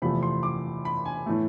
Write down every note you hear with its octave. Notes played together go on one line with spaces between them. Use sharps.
E2 C3 F3 A3 B5
C6
D6
B5
G#5
A2 E3 A3